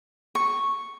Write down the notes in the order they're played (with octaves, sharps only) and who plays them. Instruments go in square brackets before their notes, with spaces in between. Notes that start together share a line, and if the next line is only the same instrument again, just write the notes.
[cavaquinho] C#6